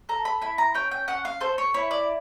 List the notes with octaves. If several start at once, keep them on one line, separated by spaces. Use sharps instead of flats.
A4 A#5
B5
E4 B5
A#5
C#4 G5
G5
C#4 F#5
F5
A4 C5
C#5
E4 C#5
D5